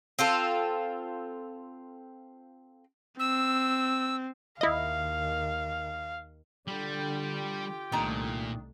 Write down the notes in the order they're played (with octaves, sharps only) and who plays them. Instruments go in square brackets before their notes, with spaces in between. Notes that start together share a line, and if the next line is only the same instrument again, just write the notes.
[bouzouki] C4 F4 A4
[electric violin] C4 [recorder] E6
[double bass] D#2 D#3 [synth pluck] E4 D#5 [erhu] F5
[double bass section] D3 [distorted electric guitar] G3 [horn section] F4 G4 G5
[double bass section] C2 A3 [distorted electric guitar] A#2 [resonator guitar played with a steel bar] D#3 D4 A#5